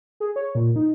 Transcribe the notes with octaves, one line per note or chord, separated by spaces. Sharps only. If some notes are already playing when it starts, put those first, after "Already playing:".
G#4
C#5
A#2
D#4